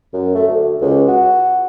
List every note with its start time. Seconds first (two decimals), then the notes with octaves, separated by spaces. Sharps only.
0.13 F#2
0.35 A3
0.48 D2
0.81 C#2
1.08 F#4